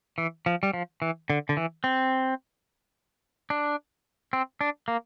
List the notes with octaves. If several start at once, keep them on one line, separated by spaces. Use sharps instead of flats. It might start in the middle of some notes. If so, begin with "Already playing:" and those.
E3
F3
G3
F3
E3
D3
D3
E3
C4
D4
C4
D4
A#3